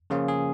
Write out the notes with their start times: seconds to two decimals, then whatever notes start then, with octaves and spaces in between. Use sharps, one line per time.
0.10 C#3 F3 A#3 C#4 F4 G#4
0.28 G#4